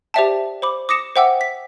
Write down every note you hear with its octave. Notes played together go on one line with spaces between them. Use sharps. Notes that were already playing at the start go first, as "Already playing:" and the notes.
G4 C5 D5 E5 G5 A5
C5 B5 D6
D6 D#6 A#6 C#7 E7
C5 E5 F#5 G5 D6 E6
B6